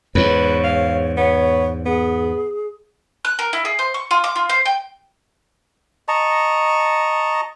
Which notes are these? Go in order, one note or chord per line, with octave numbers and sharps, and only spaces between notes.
E2 G#2 B4 C#5
F5
B3 C#5
B3 G#4
F#6
A#4
E4
G#4
C5
C#6
F4
D6
F4
C5
G5
D#5 A5 A#5 C#6